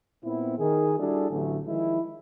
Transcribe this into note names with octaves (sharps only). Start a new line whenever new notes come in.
A#2 B3 C4 E4
D#3 G#4
G3 D4 E4 F#4 G#4 A4
A1 D3 F#3 A3
D#3 F3 G#3 E4